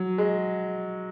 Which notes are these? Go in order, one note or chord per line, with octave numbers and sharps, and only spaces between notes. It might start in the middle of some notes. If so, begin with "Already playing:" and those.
Already playing: F#3
G#3